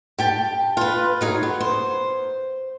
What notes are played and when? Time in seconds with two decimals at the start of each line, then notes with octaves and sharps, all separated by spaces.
0.19 G4 G5 A5
0.77 F4 B4
1.21 F#3 D#4 G#4
1.43 B3
1.61 C5